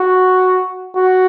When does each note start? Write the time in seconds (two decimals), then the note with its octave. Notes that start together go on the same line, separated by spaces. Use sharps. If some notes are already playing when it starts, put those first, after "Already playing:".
Already playing: F#4
0.96 F#4